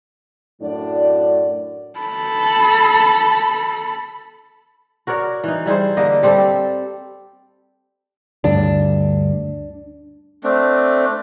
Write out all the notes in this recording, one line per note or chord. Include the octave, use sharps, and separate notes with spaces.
F#2 A2 F#3 D4 D5
A4 B5
F#4 A#4 C#5 D5
E3 D#4
G3 E4 G#4 C5
D3 A#3 D#5
G3 C4 G4 A4
D2 G2 D4
A3 C4 D4